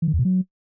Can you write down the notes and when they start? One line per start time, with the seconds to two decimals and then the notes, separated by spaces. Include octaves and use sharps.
0.02 E3
0.08 D#3
0.13 E2
0.19 B2
0.25 F#3